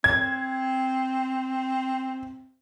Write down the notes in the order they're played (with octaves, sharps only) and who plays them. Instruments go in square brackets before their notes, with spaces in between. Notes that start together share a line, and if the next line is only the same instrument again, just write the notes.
[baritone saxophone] C4 [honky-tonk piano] G#6